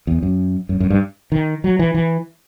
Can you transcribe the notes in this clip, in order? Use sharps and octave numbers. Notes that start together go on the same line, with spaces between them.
E2
F#2
F#2
F#2
G2
D#3
F#3
E3
E3